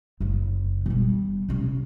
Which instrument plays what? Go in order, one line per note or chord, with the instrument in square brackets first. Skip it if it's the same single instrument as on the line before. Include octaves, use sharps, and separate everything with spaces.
[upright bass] F#1 C#3
B2 G3
C3 C#4